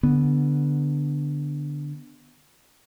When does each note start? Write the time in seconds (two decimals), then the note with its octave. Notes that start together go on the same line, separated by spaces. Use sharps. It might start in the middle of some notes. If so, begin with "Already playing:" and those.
0.03 D3 B3